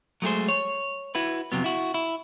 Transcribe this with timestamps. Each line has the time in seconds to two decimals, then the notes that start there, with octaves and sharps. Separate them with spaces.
0.22 F#3 G#3 A3 G4 G#4 C5
0.49 C#5
1.15 E4 F#4 B4
1.52 F2 A2 C3 F#3 B3
1.64 E4 F#4
1.94 E4